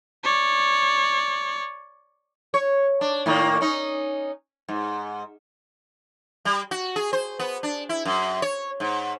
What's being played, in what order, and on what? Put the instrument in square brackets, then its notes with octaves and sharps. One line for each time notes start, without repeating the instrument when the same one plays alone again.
[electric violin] C#5 D5
[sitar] C#5
D4
A2 D#3 A#3
C#4 D#4
G#2
G3
F#4
G#4
C5
B3
D4
E4
F#2
C#5
G#2